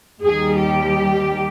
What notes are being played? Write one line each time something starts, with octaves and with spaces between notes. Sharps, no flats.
D#2 D#3 G3 G#4
G4